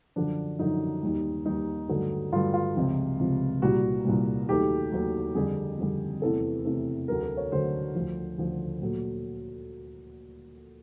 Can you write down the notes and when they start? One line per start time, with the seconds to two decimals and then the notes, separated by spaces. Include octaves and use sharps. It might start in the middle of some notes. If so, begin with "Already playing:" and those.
0.16 F#2 D3 F3 D4
0.59 F#2 D3 F3 D#4
1.03 D#2 D#3 G3
1.46 D#2 D#3 G3 D#4
1.89 G2 D3 F#3 A3
2.32 G2 D3 F#3 A3 F4
2.54 F4
2.75 C#2 C3 F3
3.19 C#2 C3 F3
3.62 C2 A#2 G3 F#4
4.05 C2 A#2 G3
4.48 D#2 D#3 F#3 A3 G4
4.92 D#2 D#3 F#3 A3
5.35 F2 D3 G3 G#4
5.78 F2 D3 G3
6.22 E2 C3 E3 A3 A4
6.65 E2 C3 E3 A3
7.08 D2 D3 F#3 A3 A#4
7.23 A4
7.37 C#5
7.52 D2 D3 F#3 A3 C5
7.95 D2 D3 F3
8.38 D2 D3 F3
8.82 A#2 F#3 A3